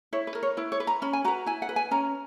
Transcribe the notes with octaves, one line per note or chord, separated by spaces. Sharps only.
E4 C#5
B4
A#4
C#5
E4 B4
C#5
B4
A#5
C#4 B5
G#5
F#4 B4 A#5
E4 G#5
F#5
B4
G#5
C#4 A#5